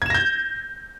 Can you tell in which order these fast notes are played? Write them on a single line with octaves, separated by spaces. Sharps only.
G#6 E7 A#6 G6